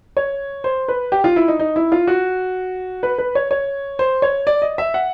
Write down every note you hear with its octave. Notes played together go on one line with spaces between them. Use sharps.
C#5
C5
B4
G4
F4
E4
D#4
D#4
E4
F4
F#4
B4
B4
C#5
C#5
C5
C#5
D5
D#5
E5
F#5